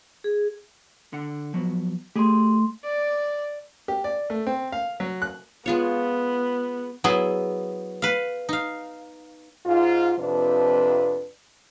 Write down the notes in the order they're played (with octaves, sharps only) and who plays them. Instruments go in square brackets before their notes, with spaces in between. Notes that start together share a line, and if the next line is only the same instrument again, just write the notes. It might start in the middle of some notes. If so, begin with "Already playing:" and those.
[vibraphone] G#4
[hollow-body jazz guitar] D3 F#5
F3 F#3 B3
[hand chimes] A3 C6 [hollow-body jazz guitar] G4 G#4
[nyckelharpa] D5
[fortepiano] G4
D5
A3
C4
F5
F#3
F#6
[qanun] G#3 F4 C#5 [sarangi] B3
[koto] F#3 B3 E4 G#4
B4 F5
D#4 F5
[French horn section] G#2 F4
F2 C3 F3 D4 B4